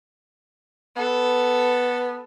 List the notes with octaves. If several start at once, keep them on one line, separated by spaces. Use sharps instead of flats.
B3 A4